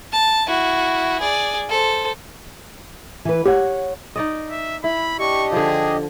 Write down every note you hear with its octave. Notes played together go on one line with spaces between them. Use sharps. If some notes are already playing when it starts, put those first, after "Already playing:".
A5
E4 F#4
G#4 D5
A4 C5
E3 B4
G4 C#5 F#5
D#4 D5 D#5
E5
E4 B5
D4 G4 D#5 C#6
D3 F3 G#4